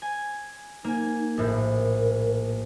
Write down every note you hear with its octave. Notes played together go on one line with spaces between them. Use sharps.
G#5
A#3 D#4 G#5
A#1 A2 A#4